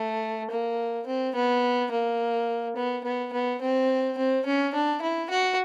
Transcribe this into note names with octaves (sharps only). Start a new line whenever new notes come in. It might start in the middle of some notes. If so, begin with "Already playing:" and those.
Already playing: A3
A#3
C4
B3
A#3
B3
B3
B3
C4
C4
C#4
D4
E4
F#4